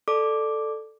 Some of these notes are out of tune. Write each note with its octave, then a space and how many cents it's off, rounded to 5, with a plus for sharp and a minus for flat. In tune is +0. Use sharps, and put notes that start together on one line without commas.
A4 +0 D5 +15 D6 +0